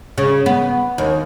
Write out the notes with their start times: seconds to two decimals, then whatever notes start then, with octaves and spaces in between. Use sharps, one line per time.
0.18 C#3
0.46 B3
0.98 D#2